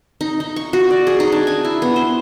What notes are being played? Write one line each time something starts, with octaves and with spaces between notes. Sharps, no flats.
D#4
D#4
C#6
F#4
D5
G#4
D#4
D4
G#5
E4
B3
C5